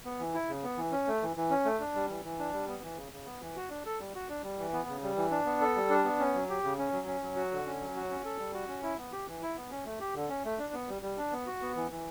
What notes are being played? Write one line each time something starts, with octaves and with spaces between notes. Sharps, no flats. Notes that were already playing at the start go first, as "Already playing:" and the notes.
B3
E3
E4
C#3
B3
E3
C#4
A3
E3
E3
C#4
A3
D4
G3
E3
E3
D4
G3
B3
E3
C#3
C#3
B3
E3
F#4
D4
A4
G3
F#4
D4
G3
E3
B3
C#3
G3
E3
D4
B3
A4
G3
D4
B3
C#4
F#3
G4
C#3
C#4
F#3
C#4
F#3
F#4
D3
C#4
F#3
F#4
C#4
A4
G3
F#4
C#4
E4
B3
G4
E3
E4
B3
C#4
A3
G4
D3
C#4
A3
D4
B3
G3
G3
D4
B3
F#4
B3
E3
E3